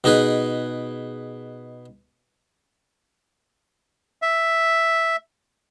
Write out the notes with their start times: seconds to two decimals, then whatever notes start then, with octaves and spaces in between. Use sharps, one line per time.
0.04 B2 D#4 G#4 B4
4.22 E5